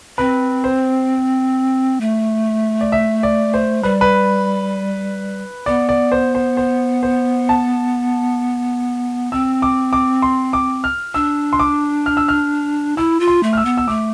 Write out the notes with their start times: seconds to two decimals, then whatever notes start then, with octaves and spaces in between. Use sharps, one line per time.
0.18 C4 B4
0.64 C5
2.01 A3
2.81 D5
2.92 E5
3.23 D5
3.54 C5
3.83 G3 B4
4.01 B4
5.66 B3 D5
5.89 D5
6.12 C5
6.35 C5
6.57 C5
7.03 C5
7.49 A5
9.32 C4 E6
9.62 D6
9.93 D6
10.22 C6
10.53 D6
10.84 F6
11.14 D4 E6
11.53 C6
11.60 D6
12.06 F6
12.17 E6
12.28 F6
12.97 E4 E6
13.20 F4
13.28 C6
13.43 A3
13.53 F6
13.57 E6
13.65 B3
13.77 E6
13.88 A3 D6